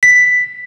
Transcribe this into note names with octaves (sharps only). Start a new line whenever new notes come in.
B6